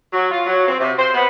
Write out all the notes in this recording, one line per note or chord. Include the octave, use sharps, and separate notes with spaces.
F#3
F4
F#3
C4
C3
C5
B3